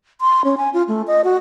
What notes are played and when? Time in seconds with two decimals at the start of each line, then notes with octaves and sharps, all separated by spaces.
0.21 C6
0.44 C#4
0.57 G#5
0.74 F4
0.88 A3
1.07 D#5
1.24 F#4